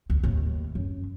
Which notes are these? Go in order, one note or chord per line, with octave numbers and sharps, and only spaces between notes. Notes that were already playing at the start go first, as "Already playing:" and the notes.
D2
D#2 A2
F#2